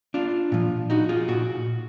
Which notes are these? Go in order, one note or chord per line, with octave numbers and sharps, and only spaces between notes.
D4 F4
A#2 F3
D#4 F#4
F4 G#4
A#2 F#4